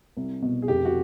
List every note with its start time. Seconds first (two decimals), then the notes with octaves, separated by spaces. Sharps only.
0.17 C2
0.42 B2
0.62 G#4
0.68 F1 G4
0.85 F#4